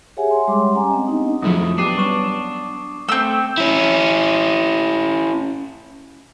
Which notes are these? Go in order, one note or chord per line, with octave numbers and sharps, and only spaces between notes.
G4 G#4 C#5 E5 F#5 G#5
C#5 E5 G#5 C6
G3 G#3 G4 G5 C6 D6
C#4 G4 F#5 G#5 A#5
C4 D#5
B3 D4 D#4 D#5 D#6
F2 F3 F#3 A3 D#4 E4 D#6
B3 D4 G4 D6 C7 D#7
G3 B3 C#4 C#6 E7
A3 C4 E6 G7
C#4 E4